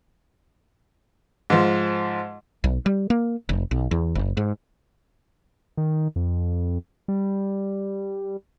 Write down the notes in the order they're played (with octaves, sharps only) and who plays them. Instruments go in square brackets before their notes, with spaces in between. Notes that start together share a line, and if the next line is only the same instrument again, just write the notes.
[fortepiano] G#2 F3
[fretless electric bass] B1
G3
A#3
F1
B1
E2
F#1
G#2
[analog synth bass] D#3
F2
G3